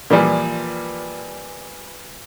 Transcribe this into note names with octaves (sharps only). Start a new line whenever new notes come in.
A#2 E3 F3 G3